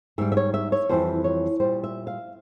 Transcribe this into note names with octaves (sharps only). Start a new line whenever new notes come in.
G#2 G3 E5
E5
C#5
E5
C#5
F2 E3 G3 C5
C#5
A#2 G3 C5
E5
F5